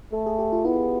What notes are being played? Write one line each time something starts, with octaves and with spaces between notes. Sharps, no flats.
A3 A4
G#4
G4
F4
B3 E4